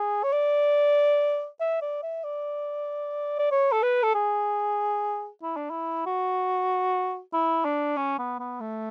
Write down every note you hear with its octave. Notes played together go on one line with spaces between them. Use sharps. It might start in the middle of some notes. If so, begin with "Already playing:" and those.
Already playing: G#4
C#5
D5
E5
D5
E5
D5
D5
C#5
A4
B4
A4
G#4
E4
D4
E4
F#4
E4
D4
C#4
B3
B3
A3